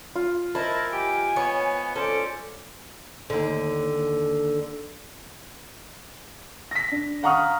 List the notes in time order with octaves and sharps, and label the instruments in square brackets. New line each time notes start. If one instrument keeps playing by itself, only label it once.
[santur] F4
[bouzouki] E4 [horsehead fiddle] A#4 [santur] C5 D#5 [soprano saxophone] A5
[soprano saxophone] G4 [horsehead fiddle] G#5
[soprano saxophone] B3 [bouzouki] C#5
[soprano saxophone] C#4 [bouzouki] A4 [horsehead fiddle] C5 D5
[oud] D#2 D3
[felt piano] A#6 B6
D4
F5 F#5 A#5 C#6 D#6 F6